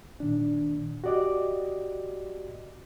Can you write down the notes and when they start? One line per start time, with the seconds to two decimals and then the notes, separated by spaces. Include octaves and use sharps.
0.20 A#2 D#3 D4
1.04 F#4 G4 D5 D#5 D6